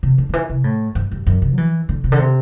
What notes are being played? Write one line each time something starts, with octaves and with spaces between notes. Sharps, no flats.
C3
D3
D3
E3
C3
A2
G2
G2
F#2
C3
F#3
E3
D3
C3
D3
C3